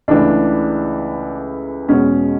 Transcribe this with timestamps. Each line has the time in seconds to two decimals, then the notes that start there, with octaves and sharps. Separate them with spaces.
0.08 C#2 C#3 E3 A3 D4
1.89 E2 B2 G#3 C#4